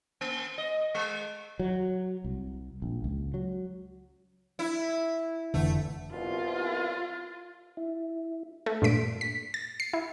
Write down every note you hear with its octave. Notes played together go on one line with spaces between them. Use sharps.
A#3
D#5
G#3
F#3
C2
A#1
C#2
F#3
E4
F1 D3 E3 A3
C2 B2 F4
E4
A3
G2 A#2 A3 B6 D7
B6
A6
C7
E4